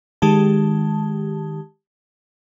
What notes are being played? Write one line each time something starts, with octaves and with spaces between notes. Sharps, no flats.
D#3 G#3 G4 A5